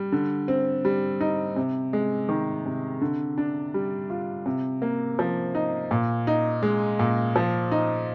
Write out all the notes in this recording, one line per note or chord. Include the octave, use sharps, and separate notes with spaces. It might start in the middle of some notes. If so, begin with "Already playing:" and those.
Already playing: G3
D3
C4
G3
D#4
C3
G#3
D#3
C3
D3
D4
G3
F4
C3
A#3
F3
D#4
A#2
D#4
G#3
A#2
F3
D#4